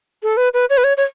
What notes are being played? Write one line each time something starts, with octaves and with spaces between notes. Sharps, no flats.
A4
B4
B4
C#5
B4
C#5
C#5